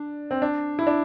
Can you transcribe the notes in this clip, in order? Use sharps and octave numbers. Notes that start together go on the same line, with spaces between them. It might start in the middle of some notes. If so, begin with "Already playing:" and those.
Already playing: D4
C4
D4
E4
D4